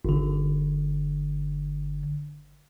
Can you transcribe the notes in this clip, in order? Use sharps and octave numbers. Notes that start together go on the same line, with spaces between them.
G1 D3